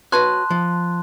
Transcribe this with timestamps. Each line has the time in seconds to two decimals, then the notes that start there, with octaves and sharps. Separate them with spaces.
0.12 F#4 B4 C#5 A5 C6 F#6
0.50 F3